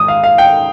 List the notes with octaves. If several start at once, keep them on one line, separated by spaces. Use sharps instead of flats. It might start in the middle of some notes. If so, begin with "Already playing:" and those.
Already playing: G#2 D#3 G#3 D#6
F5
F5
G5